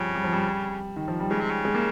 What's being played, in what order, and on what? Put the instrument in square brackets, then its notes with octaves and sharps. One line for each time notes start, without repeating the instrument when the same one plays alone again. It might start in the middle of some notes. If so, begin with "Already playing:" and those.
Already playing: [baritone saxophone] C#3 [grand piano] F3 G3 C4 C#4
[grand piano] G3
F3
G3
D#3
F3
G3
[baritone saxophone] C#3 [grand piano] G#3
[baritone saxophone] C3
C#3
[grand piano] G#3
A#3